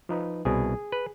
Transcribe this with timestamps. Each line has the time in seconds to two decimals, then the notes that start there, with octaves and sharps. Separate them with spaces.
0.09 F3 D#4 B4
0.45 C2 B2 G#4
0.92 B4